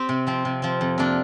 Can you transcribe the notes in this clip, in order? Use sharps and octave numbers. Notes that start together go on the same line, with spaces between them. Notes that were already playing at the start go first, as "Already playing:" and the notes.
Already playing: C4 G4
C3
F3 C4
C3
F3 C4
F2
C3 A#3 D4